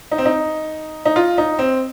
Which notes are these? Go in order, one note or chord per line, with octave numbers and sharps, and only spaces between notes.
D#4
C4
D#4
D#4
F4
D#4
C4